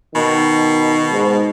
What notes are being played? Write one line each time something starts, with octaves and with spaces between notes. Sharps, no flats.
B2 D#3
G#2